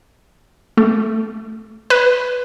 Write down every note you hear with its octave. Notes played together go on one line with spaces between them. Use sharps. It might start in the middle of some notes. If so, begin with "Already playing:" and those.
A3
B4